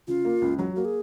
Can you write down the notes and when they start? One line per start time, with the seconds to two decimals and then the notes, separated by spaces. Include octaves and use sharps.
0.08 C#3 F4
0.25 A#3
0.42 C#2
0.59 F#3 F#4
0.76 A#3 F#4
0.85 G#4